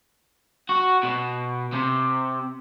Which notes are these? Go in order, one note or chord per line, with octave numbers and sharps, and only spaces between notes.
F#4
B2
C3